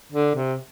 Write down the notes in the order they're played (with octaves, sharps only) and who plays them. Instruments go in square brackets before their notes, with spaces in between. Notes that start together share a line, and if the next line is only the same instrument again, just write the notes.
[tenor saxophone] D3
C3